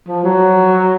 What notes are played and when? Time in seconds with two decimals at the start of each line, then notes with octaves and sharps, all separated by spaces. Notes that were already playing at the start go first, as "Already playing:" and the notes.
0.08 F3
0.24 F#3